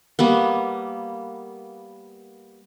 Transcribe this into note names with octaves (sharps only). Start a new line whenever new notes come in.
G3 A#3 B3